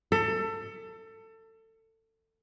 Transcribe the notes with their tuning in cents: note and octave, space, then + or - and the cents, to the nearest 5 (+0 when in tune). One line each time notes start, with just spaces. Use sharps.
A4 +25